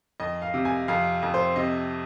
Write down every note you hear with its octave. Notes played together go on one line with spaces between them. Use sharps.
F2 D#5
F5
C3
G#5
F2 F5
F2
C5
C3 D#5